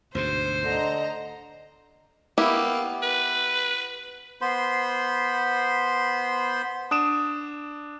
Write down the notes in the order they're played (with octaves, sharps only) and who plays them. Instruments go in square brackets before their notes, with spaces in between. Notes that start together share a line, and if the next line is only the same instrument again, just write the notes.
[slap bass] D2 G#2 B2 [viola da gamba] C5
[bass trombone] D3 [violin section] D#5 A#5
[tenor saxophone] A#3 [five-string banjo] B3 E4 G4
[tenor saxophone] B4
[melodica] B3 C5 B5 C6
[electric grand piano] D4 D#6 D7 E7